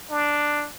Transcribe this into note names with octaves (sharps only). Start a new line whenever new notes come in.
D4